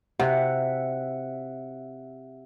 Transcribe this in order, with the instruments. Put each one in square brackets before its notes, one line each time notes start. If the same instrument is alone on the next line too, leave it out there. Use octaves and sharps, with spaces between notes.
[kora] C3 [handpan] E5 F#5